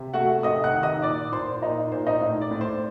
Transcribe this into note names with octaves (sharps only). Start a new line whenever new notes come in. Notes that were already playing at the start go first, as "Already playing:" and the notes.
Already playing: C3
A3 F#4 F#5
C3 D#5 D#6
F#5 F#6
D#3
D#5 D#6
A#2 D5 D6
A#2 C5 C6
A#2 D#4 D#5
A#2 C5
D#4 D#5
A2
D5
A2
C5